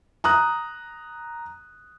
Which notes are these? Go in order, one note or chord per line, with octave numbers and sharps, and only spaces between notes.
A#5 D#6 F#6